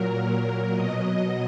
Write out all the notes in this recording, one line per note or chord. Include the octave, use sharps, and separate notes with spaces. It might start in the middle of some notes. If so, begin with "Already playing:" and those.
Already playing: A#2 F#3 A#4
B2 F#3 D#5